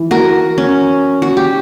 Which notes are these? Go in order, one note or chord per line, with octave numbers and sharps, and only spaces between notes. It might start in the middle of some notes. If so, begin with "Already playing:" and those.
Already playing: E3
F#4 A#4
C#4
F#4
G4